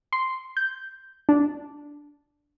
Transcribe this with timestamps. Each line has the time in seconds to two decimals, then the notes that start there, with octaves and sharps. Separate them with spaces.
0.13 C6
0.57 G6
1.29 D4